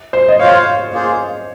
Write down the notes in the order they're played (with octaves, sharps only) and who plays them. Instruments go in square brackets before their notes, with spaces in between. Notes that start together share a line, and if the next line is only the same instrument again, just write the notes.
[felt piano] C5
D#5
[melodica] F4 C5 F5 [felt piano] C#5
[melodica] A#3 F4 G#4 C5